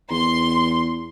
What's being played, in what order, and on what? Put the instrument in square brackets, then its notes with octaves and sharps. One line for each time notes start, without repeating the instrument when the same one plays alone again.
[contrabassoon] E2 [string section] C6